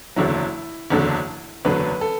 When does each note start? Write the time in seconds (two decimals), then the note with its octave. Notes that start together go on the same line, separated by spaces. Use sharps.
0.16 F#1 E2 D3 F#3 E4
0.90 F#1 E2 D3 F#3
1.65 F#1 E2 D3 F#3 B4
2.01 A4